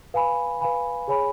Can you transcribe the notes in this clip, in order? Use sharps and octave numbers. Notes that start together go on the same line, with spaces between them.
B4 F5 G#5 B5
B4 F5 G#5 B5
G#4 C#5 G#5 B5